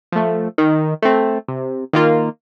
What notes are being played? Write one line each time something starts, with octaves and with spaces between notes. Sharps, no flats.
F3 A3
D#3
A3 C4
C3
D#3 A#3 F4